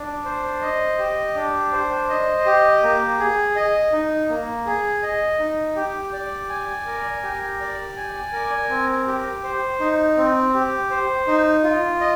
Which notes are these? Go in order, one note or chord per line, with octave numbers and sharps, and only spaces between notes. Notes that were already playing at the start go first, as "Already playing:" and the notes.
Already playing: D4
C5
D#5
G4
D4
C5
D#5
G4
A#3
G#4
D#5
D#4
A#3
G#4
D#5
D#4
G4
D5
G#5
A#4
G4
D5
G#5
A#4
C4
G4
C5
D#4
C4
G4
C5
D#4
F4
D#5